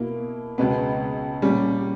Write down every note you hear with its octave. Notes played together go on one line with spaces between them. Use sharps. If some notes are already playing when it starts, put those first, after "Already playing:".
Already playing: B2 A#3 E4
C#2 B2 G#3 B3
A#2 G3 C#4